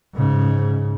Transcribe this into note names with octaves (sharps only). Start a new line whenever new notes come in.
G#2 C#3